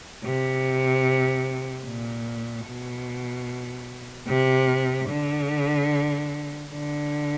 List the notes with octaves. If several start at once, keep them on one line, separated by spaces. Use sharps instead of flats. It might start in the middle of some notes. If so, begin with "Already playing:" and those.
C3
A#2
B2
C3
D3
D3